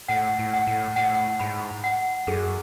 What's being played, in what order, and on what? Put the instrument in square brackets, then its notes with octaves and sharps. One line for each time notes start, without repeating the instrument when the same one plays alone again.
[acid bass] A2 [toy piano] F#5
[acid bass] A2
[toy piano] F#5
[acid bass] A2
[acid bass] A2 [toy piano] F#5
[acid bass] G#2 [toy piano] B5
[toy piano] F#5
[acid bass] F#2 [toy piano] G#4